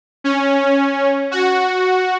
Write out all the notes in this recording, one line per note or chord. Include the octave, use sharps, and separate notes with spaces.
C#4
F#4